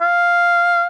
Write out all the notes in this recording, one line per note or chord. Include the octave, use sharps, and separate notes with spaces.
F5